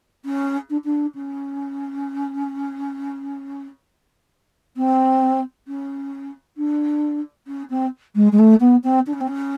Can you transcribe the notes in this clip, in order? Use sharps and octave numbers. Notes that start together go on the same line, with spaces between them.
C#4
D4
D4
C#4
C4
C#4
D4
C#4
C4
G#3
G#3
A3
B3
C4
D4
C#4
C4
C#4